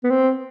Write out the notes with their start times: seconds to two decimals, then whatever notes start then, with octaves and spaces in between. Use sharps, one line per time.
0.04 B3
0.10 C4